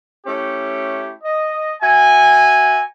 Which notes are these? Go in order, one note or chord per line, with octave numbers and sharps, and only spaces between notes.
A3 C#4 E4 G4
D#5
F#4 E5 G#5